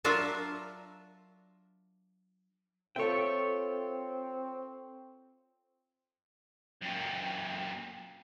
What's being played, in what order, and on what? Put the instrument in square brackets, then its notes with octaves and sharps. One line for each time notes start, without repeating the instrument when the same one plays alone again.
[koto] F#3 D4 F4 A#4 E5
[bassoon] C4 [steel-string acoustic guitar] F4 A4 E5 [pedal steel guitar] C#5 G5
[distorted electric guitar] F#2 A#2 [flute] G5